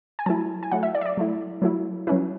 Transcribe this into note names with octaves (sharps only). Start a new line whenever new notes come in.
G#5
F#3 A3 E4 A5
G#5
F#3 A3 E4 F#5
E5
D5
E5
D5
F#3 A3 E4
F#3 A3 E4
F#3 C#4 E4 B4